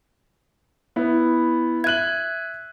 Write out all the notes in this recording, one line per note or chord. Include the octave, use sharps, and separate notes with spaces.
B3 E4
E5 F#6 G#6 D#7 F#7